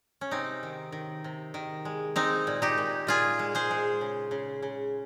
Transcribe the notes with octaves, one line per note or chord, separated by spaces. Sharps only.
C#4
C3 C4 D#4
D#3
D#3
C3
D#3
G#3
G#3 C4 D#4
A#2
D#4 G4
A#2
A#2 F4 G#4
G#3
G#4 C5
G#3
C#3
C#3
C#3